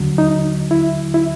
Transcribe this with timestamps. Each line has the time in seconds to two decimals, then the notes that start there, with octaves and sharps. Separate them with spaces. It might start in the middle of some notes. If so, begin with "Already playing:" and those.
Already playing: D#2 D3 F#3
0.18 D#4
0.71 E4
1.14 E4